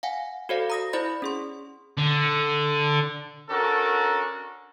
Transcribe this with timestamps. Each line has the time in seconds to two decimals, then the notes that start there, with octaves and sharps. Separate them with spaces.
0.03 F5 F#5 G#5
0.49 F#4 A4 C5 D5 F5
0.70 A#5 D#6 A#6
0.93 E4 C5 D5 B5 A6
1.22 C#4 G#4 C6
1.98 D3
3.49 C#4 D4 F#4 A4 A#4